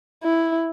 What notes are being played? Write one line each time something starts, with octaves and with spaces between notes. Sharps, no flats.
E4